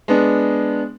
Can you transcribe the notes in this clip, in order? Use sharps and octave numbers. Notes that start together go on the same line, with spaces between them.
G#3 B3 D4